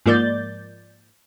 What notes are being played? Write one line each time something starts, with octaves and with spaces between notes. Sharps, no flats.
G#2 F3 A#3 D5 G6 A6